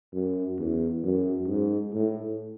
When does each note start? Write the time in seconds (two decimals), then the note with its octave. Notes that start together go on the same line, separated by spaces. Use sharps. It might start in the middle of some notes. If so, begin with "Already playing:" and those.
0.14 F#2
0.59 E2
1.04 F#2
1.47 G#2
1.93 A2